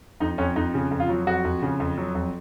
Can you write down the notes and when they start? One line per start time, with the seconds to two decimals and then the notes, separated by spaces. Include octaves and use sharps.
0.20 F2 D#4
0.38 F2 C#4
0.56 F2 D#4
0.74 C#3
0.91 F2
1.00 F4
1.09 F#3
1.27 F2 F#4
1.45 F2
1.62 C#3
1.80 F2
1.98 F#3
2.15 F2